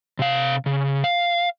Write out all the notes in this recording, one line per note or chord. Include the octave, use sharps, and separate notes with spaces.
C3 F5
C#3
F5